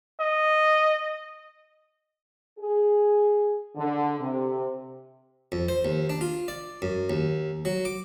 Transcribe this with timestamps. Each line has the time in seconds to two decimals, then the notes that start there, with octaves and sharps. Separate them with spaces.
0.20 D#5
2.58 G#4
3.76 D3
4.19 C3
5.52 F2
5.69 C5
5.85 D#2
6.10 D4
6.21 F4
6.48 D5
6.82 F#2
7.10 D#2
7.65 F#3
7.85 D6